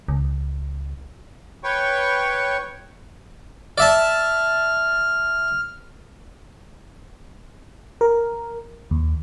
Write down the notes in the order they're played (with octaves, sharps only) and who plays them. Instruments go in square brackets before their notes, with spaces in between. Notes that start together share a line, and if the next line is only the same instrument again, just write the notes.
[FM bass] C#2
[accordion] B4 C#5 G5 C#6
[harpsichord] D5 E5 A5 [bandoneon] F6
[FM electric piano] A#4
D#2